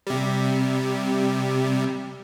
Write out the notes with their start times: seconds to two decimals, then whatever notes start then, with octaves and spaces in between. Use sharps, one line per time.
0.07 C3 G3